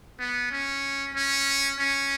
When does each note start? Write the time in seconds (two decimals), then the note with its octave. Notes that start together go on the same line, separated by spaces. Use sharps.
0.19 B3
0.51 C#4
1.15 C#4
1.79 C#4